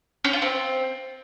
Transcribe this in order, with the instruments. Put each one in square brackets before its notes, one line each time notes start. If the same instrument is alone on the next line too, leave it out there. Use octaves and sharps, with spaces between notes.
[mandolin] C#4
F4
C4